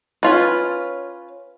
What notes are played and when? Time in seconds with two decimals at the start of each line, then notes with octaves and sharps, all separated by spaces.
0.23 C#4 F4 B4